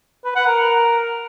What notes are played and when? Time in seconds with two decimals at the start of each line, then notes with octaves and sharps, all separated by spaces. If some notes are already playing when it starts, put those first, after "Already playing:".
0.25 B4
0.35 F#5
0.46 A#4